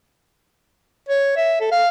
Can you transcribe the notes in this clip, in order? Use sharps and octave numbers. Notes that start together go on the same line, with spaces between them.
C#5
E5
A4
F5